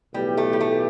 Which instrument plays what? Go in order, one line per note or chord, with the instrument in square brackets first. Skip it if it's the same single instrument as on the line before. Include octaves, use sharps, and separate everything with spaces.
[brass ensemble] B1 A2 E3 B3 G4 [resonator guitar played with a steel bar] G3
[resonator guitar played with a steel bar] A3
G3
A3